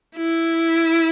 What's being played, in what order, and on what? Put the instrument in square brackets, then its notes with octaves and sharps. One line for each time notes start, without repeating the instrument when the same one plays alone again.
[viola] E4